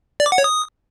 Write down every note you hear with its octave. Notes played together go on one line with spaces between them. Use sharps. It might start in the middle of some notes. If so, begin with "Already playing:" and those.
D5
D6
F#5
C#5
D#6